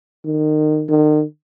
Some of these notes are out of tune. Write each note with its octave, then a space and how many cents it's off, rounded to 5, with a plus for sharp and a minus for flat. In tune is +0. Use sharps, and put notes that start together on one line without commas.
D#3 -25
D#3 -40